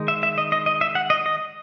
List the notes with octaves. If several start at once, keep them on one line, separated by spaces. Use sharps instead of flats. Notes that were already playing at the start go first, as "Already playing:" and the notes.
Already playing: D#3 G#3 D#4
E5
E5
D#5
D#5
D#5
E5
F#5
D#5
D#5